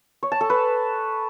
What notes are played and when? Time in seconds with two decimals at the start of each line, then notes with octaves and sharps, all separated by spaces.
0.23 C#5
0.32 A5
0.41 A4
0.50 B4